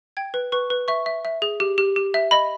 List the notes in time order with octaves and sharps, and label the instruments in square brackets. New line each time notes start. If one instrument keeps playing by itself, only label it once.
[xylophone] G5 G#6
B4
B4 C#6
B4
E5 C#6
E5
E5
G#4
G4
G4
G4
E5
D#5 B5